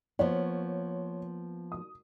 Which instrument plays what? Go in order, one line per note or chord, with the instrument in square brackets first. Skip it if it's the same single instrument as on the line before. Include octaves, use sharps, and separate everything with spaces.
[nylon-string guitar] F3 A#3 B3 [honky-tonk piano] C#5
[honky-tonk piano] D#6